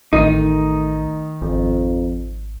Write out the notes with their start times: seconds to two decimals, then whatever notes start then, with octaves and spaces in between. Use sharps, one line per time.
0.13 A1 D#3 A3 D#4
1.42 G#1 F2